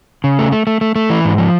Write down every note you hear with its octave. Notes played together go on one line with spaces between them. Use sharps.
C#3
A3
A3
A3
A3
A3
E3
G#2
F3